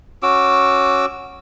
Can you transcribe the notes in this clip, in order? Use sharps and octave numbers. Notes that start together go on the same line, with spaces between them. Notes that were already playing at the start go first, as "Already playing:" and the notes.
C#4 F#4 D6 E6